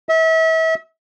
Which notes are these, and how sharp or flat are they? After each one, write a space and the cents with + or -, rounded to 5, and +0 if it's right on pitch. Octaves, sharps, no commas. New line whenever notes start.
E5 -35